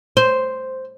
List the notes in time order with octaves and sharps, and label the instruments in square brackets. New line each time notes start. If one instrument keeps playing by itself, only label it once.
[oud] C5